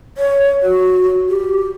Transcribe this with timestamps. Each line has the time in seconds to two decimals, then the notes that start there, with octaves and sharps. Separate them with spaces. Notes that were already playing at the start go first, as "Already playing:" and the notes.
0.17 C#5
0.63 F#4
1.29 G4